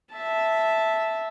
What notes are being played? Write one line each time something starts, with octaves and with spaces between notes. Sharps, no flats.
E5 A5